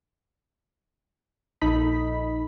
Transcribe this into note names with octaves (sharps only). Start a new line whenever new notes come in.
A#1 D#4 A4 D#5 B5 B6